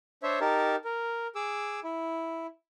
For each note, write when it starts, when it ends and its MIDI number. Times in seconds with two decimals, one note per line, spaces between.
0.23 0.39 62
0.23 0.39 72
0.23 0.39 73
0.23 0.39 76
0.41 0.76 63
0.41 0.76 67
0.41 0.76 70
0.41 0.76 81
0.84 1.27 70
1.35 1.80 68
1.35 1.80 86
1.35 1.80 88
1.84 2.47 64